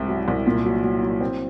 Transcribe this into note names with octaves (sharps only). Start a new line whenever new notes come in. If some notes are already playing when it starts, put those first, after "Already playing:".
Already playing: C2 G#2 C3
F#3
C2
A#2
F#3
F#3
F#3
C4